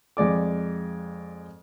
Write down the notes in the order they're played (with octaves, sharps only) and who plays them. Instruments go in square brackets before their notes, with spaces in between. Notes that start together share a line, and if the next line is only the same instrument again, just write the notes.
[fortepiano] F2 G#3 D5 D6